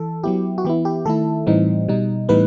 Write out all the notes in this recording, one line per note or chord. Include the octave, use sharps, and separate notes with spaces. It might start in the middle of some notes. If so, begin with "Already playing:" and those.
Already playing: E3 A4
F#3 B3 E4 G4
F#4
E3 B3 E4 G4
G4
D#3 A3 E4 A4
A2 E3 G3 C4 D#4
B2 G3 D#4
A2 E3 G3 B3 D#4 B4